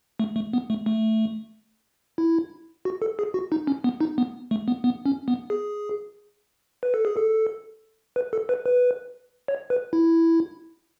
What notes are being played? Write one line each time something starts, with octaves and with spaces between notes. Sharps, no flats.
A3
A3
B3
A3
A3
E4
F#4
A4
G#4
F#4
D#4
C#4
B3
D#4
B3
A3
B3
B3
C#4
B3
G#4
B4
A4
G#4
A4
B4
A4
B4
B4
C#5
B4
E4